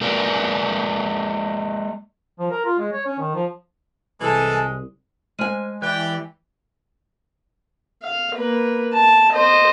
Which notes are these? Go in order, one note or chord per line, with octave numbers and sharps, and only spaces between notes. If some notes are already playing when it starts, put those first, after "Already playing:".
G#3 A#3 A#4 B4 D5
F3
A#4
F4
G#3
C#5
C#4
D#3
F3
C2 E3 G#3 A4 G#5
G#3 C5 G#5 F6 D#7
E3 G4 D5 G5 F#6
F5
A#3 B4
A5
C5 D#5